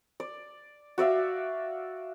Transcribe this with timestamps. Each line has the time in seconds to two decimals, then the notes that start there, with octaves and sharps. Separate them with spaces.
0.20 D5
0.98 F#4 D5 E5 F5